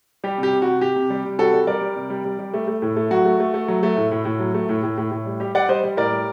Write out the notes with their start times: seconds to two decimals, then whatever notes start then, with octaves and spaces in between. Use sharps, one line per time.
0.24 G3 G4
0.38 C3
0.43 G4
0.53 C3
0.62 F#4
0.67 C3
0.81 C3 G4
0.96 C3
1.10 G3
1.25 C3
1.39 G3 F#4 A4
1.53 G3
1.67 G3 A#4 D5
1.81 G3
1.96 C3
2.10 G3
2.25 G3
2.39 G3
2.54 A3
2.68 A3
2.82 A2
2.96 A3
3.11 F#3 F#4
3.25 A3
3.40 A3
3.54 A3
3.68 F#3
3.83 A3
3.97 A2
4.11 A2
4.25 A2
4.40 F#3
4.54 A3
4.69 A2
4.83 A2
4.98 A2
5.12 A2
5.26 G3
5.40 G3 G4
5.55 G3 D5 F#5
5.69 G3 C5 D#5
5.84 G3
5.97 A2 A#4 D5
6.12 G3